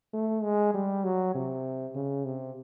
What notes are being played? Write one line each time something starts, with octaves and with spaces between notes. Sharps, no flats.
A3
G#3
G3
F#3
C3
C#3
C3